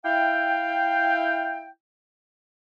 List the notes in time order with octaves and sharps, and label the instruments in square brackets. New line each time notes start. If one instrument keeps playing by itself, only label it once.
[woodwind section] E4 F5 G5